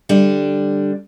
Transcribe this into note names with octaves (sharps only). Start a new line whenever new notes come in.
D3 G3 D4